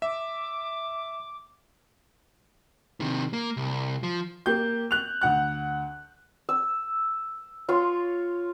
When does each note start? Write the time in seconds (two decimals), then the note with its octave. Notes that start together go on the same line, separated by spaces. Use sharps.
0.02 E5 D6
3.00 C3 D#3
3.33 A#3
3.57 C2
4.03 F3
4.46 A#3 G4 G6
4.91 F#6 F7
5.21 D2 F#5 F#6
6.49 E6
7.69 F4 C#5 C6